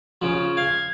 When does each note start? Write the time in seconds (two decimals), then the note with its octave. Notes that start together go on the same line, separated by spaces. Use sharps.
0.22 C#3 F3
0.57 F5 G#6